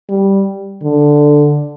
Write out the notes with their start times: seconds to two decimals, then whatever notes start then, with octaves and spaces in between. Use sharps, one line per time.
0.09 G3
0.83 D3